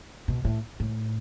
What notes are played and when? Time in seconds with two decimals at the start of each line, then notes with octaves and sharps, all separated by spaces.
0.28 B2
0.45 A2
0.80 A2